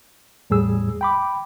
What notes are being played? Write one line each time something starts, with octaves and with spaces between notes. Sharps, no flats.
E2 A2 G3 G#4 E6
G5 B5 D6